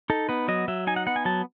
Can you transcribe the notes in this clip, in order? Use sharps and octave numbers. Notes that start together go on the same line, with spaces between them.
D#4 A4
B3 B4
F#3 D#5
F#3 E5
D#4 G#5
F#5
B3 F#5
G#5
F#3 A5